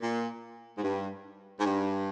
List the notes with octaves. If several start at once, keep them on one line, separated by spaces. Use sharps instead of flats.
A#2
G#2
G2
G#2
G2